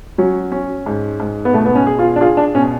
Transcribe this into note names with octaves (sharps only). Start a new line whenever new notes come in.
F#3 C#4
C#4
G#2
G#2
B3
B2 A3
B3
C#4
G#4
F4
D4
F4 G#4
D4
B2 C#4